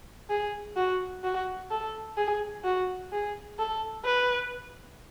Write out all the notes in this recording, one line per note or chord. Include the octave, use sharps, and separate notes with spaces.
G#4
F#4
F#4
A4
G#4
F#4
G#4
A4
B4